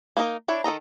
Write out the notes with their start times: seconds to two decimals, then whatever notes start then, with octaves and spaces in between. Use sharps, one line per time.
0.17 A#3 D4 D#4 A#4 D#5
0.48 D4 E4 C#5
0.64 D#3 A4 D#5 A#5